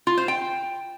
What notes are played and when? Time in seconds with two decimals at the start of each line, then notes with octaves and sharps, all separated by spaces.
0.07 F4
0.18 C5
0.28 G5